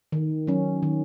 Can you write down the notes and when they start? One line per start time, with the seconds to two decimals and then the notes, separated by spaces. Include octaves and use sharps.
0.12 D#3
0.47 F#3 C#4
0.83 D#3